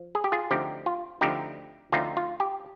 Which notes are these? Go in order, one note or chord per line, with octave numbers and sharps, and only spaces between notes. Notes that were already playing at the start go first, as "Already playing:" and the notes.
Already playing: F3
G#4
G4
F4 G#4
D2 D3 F3 C4 D#4 G4
F4
D2 D3 F3 C4 D#4 G4
D2 D3 F3 C4 D#4 F4
F4
G4